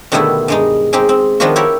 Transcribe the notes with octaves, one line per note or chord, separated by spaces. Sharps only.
B2 D3 D#3 G3 A3 E4
G2 G#3 D#4
G#3 C4 D#4 G4
C4
D#3 F3 B3 D4 F4 F#4
E4 G4 A#4 C#5